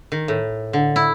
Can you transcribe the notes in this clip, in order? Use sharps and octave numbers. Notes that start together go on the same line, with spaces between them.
D#3
A2
D3
E4